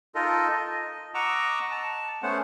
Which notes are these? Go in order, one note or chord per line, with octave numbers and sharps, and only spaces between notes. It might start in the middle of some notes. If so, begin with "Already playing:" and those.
D#4 F4 A4 A#4 D#5
D#5
D#5 F#5 A#5 C#6 D6 E6
A5
A3 B3 C#4 C5 F#5